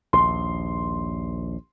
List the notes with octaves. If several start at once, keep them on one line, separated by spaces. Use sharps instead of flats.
A#1 D#2 C6